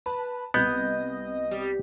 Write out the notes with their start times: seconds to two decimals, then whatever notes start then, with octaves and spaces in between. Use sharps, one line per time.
0.06 B4 A5
0.54 C2 B3 D#5 G6
1.51 G3